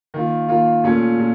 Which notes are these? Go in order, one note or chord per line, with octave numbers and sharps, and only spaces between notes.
D#3 A#3 F4
D#3 A#3 F4
A#2 A3 C#4 F4
A#2